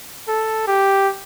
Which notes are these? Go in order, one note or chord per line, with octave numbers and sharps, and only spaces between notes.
A4
G4